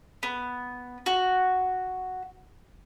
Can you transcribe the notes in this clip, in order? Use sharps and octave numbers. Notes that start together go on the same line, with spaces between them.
B3
F#4